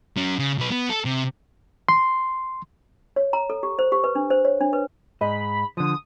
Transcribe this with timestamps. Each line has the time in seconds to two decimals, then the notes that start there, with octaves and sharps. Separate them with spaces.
0.17 F#3 C#4
0.39 C#3
0.58 B1 B4
0.71 B3
0.90 A4
1.05 C3
1.89 C6
3.16 C#5
3.33 A#5
3.50 A4
3.63 G4
3.79 C5
3.92 G4
4.04 B4
4.15 D4
4.30 C5
4.45 C#5
4.61 D4
4.73 B4
5.21 G#2 D#5 B5
5.77 D3 F3 D#6